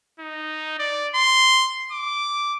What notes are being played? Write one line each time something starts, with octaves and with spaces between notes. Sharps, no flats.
D#4
D5
C6
D6